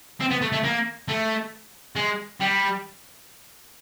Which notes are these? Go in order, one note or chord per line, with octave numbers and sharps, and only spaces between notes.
C4
B3
A3
A3
A#3
A3
G#3
G3